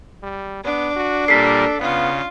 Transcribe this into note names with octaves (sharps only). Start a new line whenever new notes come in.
G3
B3 D4
F#4
A#2 G3 A#3 A4 B6 C7
C#3 B3 F4